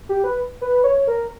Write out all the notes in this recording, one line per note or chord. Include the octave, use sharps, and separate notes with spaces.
G4
B4
B4
C#5
A#4